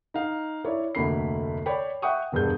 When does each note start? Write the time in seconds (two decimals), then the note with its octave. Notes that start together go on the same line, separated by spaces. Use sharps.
0.14 D#4 F5
0.64 E4 C#5 D5
0.95 F1 D2 A3 A#3 B5 C7
1.66 C#5 D5 G5 B5
2.02 E5 F#5 G5 C#6 D#6
2.32 E1 G2 G#4 G6